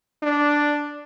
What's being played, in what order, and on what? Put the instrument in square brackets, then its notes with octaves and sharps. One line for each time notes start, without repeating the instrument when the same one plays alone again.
[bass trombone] D4